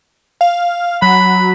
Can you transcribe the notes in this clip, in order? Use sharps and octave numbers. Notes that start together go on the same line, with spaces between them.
F5
F#3 B5